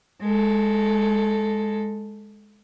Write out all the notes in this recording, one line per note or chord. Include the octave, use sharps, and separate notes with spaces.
G#3 A4